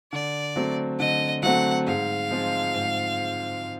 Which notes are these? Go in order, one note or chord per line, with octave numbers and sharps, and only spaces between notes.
D3 D5
F#3 A3 C4
D3 D#5
F#3 A3 C4 F#5
G#2 F5
F3 G#3 C4 F4
G#2